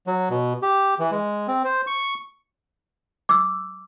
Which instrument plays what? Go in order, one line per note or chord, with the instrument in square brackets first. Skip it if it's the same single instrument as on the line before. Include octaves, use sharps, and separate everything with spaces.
[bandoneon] F#3
B2
G4
E3
G#3
C4
C5
C#6
[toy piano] D6 E6